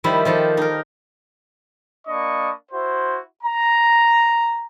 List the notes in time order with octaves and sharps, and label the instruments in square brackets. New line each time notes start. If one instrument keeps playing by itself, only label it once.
[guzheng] D#3 F3 G3 E4 B5
D#3 F3 G4 A4
D#4 A#4
[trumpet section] A#3 D4 D#5 B5 C#6
E4 F#4 C5
A#5